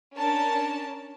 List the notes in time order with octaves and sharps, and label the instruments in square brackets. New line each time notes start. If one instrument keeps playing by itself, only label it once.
[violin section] C#4 D4 A#4 A5